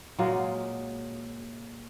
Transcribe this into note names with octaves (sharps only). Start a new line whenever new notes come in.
A#2 F#3 G#3 F4